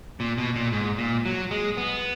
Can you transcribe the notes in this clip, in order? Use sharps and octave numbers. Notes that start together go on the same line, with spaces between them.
A#2
B2
A#2
G#2
A#2
F#3
G#3
B3